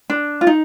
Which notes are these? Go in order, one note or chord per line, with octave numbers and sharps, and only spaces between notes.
D4
F4
D#4